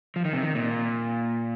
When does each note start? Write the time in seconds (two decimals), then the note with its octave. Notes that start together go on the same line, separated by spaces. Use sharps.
0.16 F3
0.25 D#3
0.33 C3
0.42 D#3
0.55 A#2